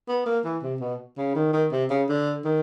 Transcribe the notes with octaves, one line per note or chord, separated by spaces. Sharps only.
B3
A#3
E3
C3
B2
C#3
D#3
D#3
C3
C#3
D3
D#3